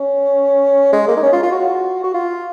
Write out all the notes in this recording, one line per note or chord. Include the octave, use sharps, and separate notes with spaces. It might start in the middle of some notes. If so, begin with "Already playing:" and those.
Already playing: C#4
G#3
A#3
D#4
C#4
F4
F4
F#4
F#4
F4